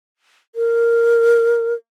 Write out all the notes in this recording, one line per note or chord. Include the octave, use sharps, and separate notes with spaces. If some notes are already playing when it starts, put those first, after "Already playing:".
A#4